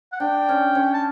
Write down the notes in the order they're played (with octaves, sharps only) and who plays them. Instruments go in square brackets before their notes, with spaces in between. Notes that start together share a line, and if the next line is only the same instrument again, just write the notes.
[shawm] F#5
[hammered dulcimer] D4 [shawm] G5
[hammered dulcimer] C#4
C#4
[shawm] A5